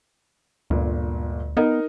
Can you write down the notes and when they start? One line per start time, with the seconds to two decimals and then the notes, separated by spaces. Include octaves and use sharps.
0.70 G1 D2 A#2
1.57 B3 D#4 A#4 D#5